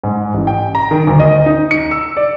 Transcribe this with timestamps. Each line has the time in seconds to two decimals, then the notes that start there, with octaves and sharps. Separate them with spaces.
0.03 G#2
0.34 A1
0.47 G5
0.75 A#5
0.91 D#3
1.07 D2
1.20 D#5
1.46 D#4
1.71 C#7
1.91 E6
2.17 D5